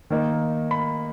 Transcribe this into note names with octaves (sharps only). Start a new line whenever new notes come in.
D#3 A#3 D#4
B5